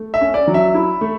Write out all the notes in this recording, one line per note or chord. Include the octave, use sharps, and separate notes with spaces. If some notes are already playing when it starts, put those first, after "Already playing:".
Already playing: A3
E5
C#4
D5
F#3
E5
E4
A3